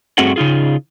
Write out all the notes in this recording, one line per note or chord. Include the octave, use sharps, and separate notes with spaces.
G2 A3 C4 F#4 G#4 F#5
C#3 D#4 F4 G#4